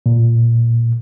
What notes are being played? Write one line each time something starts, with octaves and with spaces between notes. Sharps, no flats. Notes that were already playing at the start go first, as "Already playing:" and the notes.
A#2